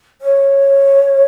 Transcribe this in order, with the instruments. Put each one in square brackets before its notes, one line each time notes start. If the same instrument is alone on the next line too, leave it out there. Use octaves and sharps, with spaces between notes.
[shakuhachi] C#5